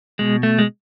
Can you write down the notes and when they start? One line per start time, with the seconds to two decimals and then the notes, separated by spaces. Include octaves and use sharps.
0.19 B2 G#3
0.43 A3
0.59 G#3